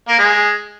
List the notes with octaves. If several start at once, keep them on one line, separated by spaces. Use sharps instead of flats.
A#3
G#3